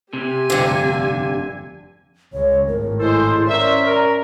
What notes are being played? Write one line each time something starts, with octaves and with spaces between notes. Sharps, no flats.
C3 G4 G#5
F1 G2 D3
C#2 G#3 C#5
G#1 A2 A#4
G#3 E4 A4 C5
C#4 A#4 C5 D5 E5
A#4